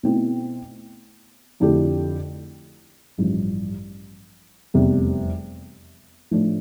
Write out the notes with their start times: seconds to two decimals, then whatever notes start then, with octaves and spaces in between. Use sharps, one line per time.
0.03 B2 A3 C4 E4
1.60 F2 D3 A3 E4 G4
3.18 A1 G2 F3
4.74 F1 E2 C3 G3
6.31 A2 F3 A3 D4